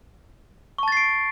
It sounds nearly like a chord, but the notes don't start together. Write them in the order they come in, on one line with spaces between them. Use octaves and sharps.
C#6 A5 A6 C7 D7